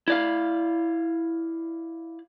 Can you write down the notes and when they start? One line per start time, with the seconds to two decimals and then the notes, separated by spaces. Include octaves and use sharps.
0.08 E4 D5 F5